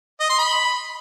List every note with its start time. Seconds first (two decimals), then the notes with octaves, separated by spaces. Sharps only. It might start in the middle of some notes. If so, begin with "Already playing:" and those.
0.21 D#5
0.30 C6
0.39 B5